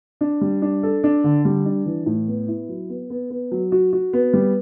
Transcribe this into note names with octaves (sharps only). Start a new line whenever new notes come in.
D4
G3
D4
A4
D4
D3
G3
D4
E3
A2
B3
E4
F#3
B3
B3
B3
F#3
F#4
F#4
B3
G3